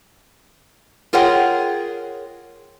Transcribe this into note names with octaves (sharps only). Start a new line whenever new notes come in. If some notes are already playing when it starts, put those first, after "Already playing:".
F4 G#4 A#4 C#5 F#5 G5